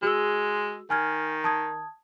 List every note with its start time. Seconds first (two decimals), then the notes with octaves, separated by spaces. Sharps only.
0.03 G#3 F#4 G#4 E6
0.90 D#3 G#5 F6 G#6
1.44 A5 D#6 G#6